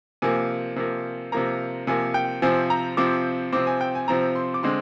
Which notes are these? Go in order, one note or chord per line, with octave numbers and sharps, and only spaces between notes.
C3 F3 A#3 G#5
C3 F3 A#3
C3 F3 A#3 A#5
C3 F3 A#3 G#5
G5
C3 F3 C4 G#5
A#5
C3 F3 C4 D6
C3 F3 C4 D6
G#5
G5
G#5
C3 F3 C4 A#5
C6
D6
D3 G#3 C4 C6